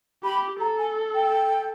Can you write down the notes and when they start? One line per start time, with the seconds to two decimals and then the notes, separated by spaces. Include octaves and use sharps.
0.24 G4 B5
0.60 A4 A#5
0.78 G#5
1.15 G5